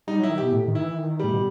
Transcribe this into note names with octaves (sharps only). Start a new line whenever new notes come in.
G3 D#4
F#3 E4
D#3
B2 G4
A2
D#3
E4
E3
D#3
A2 G3
B2